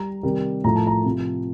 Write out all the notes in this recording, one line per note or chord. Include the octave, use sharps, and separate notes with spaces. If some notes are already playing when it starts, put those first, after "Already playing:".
Already playing: G3 A#5
C3 D#3 G3
A2 F3 A#5
A5
A#5
C3
F3